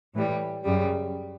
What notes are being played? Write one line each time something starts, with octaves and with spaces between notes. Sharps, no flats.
A2 E3 G3
F#2 C#3 G3